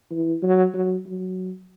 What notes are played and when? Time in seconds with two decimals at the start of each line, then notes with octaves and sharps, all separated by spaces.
0.11 E3
0.43 F#3
0.74 F#3
1.06 F#3